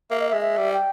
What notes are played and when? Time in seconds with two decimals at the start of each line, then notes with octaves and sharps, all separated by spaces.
0.10 A#3 E5
0.20 D#5
0.29 E5
0.34 G#3
0.41 E5
0.57 G3
0.73 G5